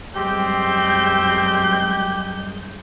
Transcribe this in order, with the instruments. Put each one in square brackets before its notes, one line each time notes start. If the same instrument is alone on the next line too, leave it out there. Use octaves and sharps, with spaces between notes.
[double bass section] F#2 G3 G#3 [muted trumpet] C4 [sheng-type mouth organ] G4 [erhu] G6